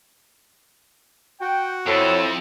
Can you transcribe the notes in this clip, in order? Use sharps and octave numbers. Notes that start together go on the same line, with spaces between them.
F#4 G5
F2 C4 E4 A4 C#5